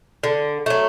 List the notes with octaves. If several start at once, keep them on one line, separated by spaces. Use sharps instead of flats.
D3
F#3 A3